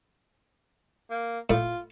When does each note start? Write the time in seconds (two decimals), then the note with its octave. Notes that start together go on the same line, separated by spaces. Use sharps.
1.10 A#3
1.50 A2 F4